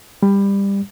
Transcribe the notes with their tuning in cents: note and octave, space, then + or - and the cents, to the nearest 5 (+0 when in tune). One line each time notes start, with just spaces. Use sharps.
G3 +20